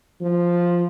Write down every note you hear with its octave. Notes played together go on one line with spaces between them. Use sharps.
F3